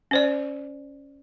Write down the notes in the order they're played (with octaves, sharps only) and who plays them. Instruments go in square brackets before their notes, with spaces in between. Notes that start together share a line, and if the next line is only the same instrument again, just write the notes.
[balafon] C#4 C5 D5